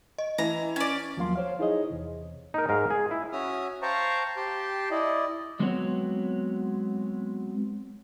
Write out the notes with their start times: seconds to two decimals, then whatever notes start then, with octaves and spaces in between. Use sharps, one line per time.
0.18 D#5
0.38 E3 A#5
0.76 C#4 D5
1.17 D#2 F3 F#3 A#3 F5 C6
1.36 C5 C#5 F5
1.59 D#4 E4 G#4 C5 C#5 D#5
1.90 E2 C3
2.54 D#4 A#4
2.69 G#2 A#4 F5
2.90 G#4
3.11 E4
3.32 C#4 F#4 E5 D#6 F6
3.82 C5 F5 G5 A5 A#5 C#6
4.37 G4 G5 A5 C6
4.91 E4 D5 D#5
5.60 F#3 G#3 B3 C4 F#4 C#5